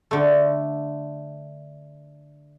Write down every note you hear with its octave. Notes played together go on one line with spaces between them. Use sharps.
D3 A3